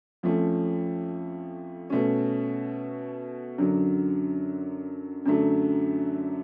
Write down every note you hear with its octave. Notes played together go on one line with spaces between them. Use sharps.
F2 F3 A3 C#4
B2 A3 C#4
F#2 D3 F#3
F#2 D3 F#3 A3